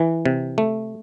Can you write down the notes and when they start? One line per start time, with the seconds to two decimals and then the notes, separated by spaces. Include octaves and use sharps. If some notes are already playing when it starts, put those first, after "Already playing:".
Already playing: E3
0.25 C3
0.58 A3